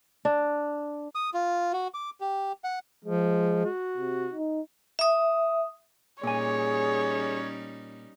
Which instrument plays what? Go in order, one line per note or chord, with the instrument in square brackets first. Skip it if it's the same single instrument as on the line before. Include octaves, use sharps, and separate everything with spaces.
[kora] D4
[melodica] D#6
F4
F#4
D6
G4
F#5
[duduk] F3 [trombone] G#3
[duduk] F#4
[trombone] C3
D#4
[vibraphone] E5 D#6
[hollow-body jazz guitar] A#2 G#5 [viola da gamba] G3 C#4 D#4 [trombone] G#4 [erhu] C#5